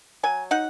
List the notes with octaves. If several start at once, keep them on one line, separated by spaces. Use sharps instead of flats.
F#3 G#5
D#4 F#5